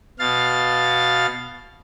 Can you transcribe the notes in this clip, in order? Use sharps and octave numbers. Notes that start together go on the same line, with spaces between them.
B2 F5 A6